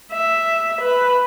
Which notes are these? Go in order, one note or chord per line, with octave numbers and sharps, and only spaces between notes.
E5
B4